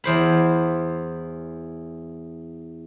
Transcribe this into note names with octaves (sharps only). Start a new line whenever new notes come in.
E2 C5 B5